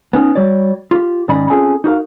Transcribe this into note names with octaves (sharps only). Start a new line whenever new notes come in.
B3 C#4 D#4
G3 F#4 C#5 D5
F4 G4
G#2 D#3 C#4 D5 D#5 B5
C4 C#4 F4 G#4 A4 G#5
D#4 F#4 A#4 F5